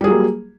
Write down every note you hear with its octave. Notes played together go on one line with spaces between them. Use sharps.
F#3 G3 A#3 G#4